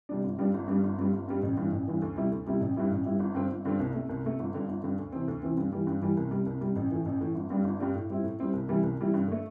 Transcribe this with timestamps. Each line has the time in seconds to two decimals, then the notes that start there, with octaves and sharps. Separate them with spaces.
0.09 C3 G3 D4
0.24 G1
0.38 G2 G3 D4
0.54 G1
0.68 G2 G3 D4
0.84 G1
0.99 G2 G3
1.13 G1
1.28 G2 G3
1.43 A1
1.57 G2 E3
1.73 A1
1.87 G2 E3
2.02 D2
2.16 C3 G3 E4
2.32 D2
2.47 C3 G3 E4
2.61 A1
2.76 G2 G3 E4
2.91 A1
3.05 G2 G3 E4
3.20 G1
3.35 G2 D3 C4
3.50 G1
3.65 G2 D3 C4
3.80 C2
3.94 C3 A3
4.09 C2
4.24 C3 A3
4.39 G1
4.54 G2 D3
4.68 G1
4.83 G2 D3
4.98 D2
5.12 C3 E3 C4
5.28 D2
5.43 C3 E3 C4
5.57 G2
5.72 E3 G3
5.87 G2
6.02 E3 G3
6.17 C2
6.31 C3 G3
6.46 C2
6.61 C3 G3
6.76 A1
6.91 A2 E3
7.06 A1
7.21 A2 E3
7.35 G1
7.50 G2 G3 D4
7.64 G1
7.79 G2 G3 D4
7.95 A2
8.10 G3 C4 E4
8.24 A2
8.39 G3 C4 E4
8.53 C2
8.68 C3 E3 G3 E4
8.83 C2
8.98 C3 E3 G3 E4
9.14 G2
9.27 D3 A3